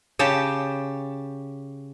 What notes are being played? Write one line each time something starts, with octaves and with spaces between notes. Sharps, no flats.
C#3 G4 A5